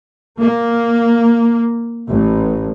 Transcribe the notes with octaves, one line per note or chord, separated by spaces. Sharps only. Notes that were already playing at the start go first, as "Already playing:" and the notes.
A#3
A1